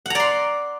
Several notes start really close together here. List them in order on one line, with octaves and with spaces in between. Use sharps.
F#5 A#5 D5 C6